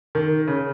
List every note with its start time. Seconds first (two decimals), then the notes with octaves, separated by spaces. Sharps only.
0.15 D#3
0.47 C#3